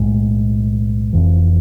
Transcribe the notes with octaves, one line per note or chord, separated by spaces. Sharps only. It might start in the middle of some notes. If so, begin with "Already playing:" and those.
Already playing: B1 A2 G#3
F1 F2 E3